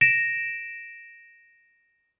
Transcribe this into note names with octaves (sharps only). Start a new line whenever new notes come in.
A#6 D7 E7